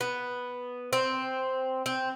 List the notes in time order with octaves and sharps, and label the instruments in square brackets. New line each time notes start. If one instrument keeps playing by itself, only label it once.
[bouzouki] B3
C4
C4